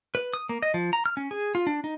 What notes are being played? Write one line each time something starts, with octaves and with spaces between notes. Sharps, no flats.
B4
D#6
A#3
D#5
F3
A#5
F6
C#4
G#4
F4
D4
D#4